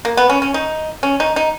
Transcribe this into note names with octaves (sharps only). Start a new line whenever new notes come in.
A#3
B3
C#4
C#4
D#4
C#4
D#4
D#4